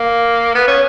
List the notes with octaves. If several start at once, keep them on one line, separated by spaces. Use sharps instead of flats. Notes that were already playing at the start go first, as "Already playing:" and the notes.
Already playing: A#3
B3
C#4